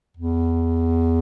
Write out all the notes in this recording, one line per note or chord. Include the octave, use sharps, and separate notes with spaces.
E2